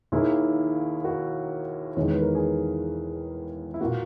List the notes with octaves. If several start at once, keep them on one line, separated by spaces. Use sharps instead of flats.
D#2 D#3 A#3 E4 G#4
F#4 A#4
E2 D#3 G#3 C#5
B4
A#4
G#4 B4
E4
A#2 A#3 F#4